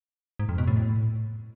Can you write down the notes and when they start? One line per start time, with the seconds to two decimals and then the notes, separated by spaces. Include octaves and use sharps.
0.39 G#2
0.49 F2
0.58 B2
0.67 A2